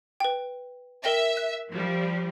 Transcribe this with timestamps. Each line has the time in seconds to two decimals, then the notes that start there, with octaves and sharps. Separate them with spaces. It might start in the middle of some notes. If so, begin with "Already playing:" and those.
0.20 B4 G5
1.04 A#4 E5 G5 A#6
1.37 F#6
1.71 F3 G3